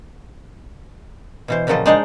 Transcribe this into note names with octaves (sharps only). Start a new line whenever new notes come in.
B2 E3 C5
A#2 C#3 F3 F#3 A4 D#5
G#3 D4 D#4 C5 D5 D#5